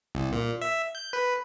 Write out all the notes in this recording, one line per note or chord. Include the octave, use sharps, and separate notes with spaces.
C2
A#2
E5
G6
B4